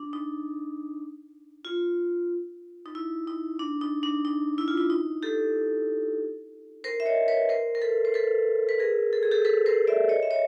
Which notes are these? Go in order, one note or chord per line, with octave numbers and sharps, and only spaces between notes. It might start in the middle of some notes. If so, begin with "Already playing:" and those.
Already playing: D4
D#4
F4
D#4
E4
D#4
D4
D#4
D4
D#4
E4
F4
E4
D#4
G4 A4
A#4 C5
E5
C#5 D#5
B4 C#5
A#4 C5
A#4
A4 B4
C5
A4 B4
B4
G#4 A#4
A4
G#4
G4 A4
A4 B4
A#4 C5
D5 E5
C#5 D#5
E5
C#5 D#5